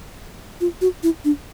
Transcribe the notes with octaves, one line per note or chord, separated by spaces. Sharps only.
F4
F#4
E4
D4